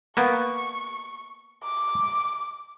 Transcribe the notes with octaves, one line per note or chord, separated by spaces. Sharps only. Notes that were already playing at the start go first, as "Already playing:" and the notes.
A#3 B3 C#6
D6